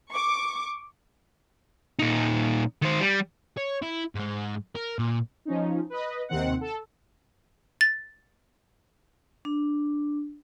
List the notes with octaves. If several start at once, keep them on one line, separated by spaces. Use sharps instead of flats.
C#6 D6
A#2 D#4
D#3 C5
G3
C#5
E4
G#2 G#3
A#4
A#2
F3 C#4 D#4
B4 D#5
D#2 C3 D#3 C4 F#5
A4
A6
D4